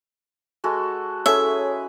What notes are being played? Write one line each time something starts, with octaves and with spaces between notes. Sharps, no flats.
G#3 F#4 A4
C#4 E4 G#4 A4 C#5 E5